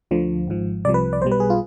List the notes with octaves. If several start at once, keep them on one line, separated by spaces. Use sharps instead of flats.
D2 D3 F3
G#1 G#2 F3
C2 C3 F3 D5
B4
D5
B1 B2 G3 C5
B4
G#4
F4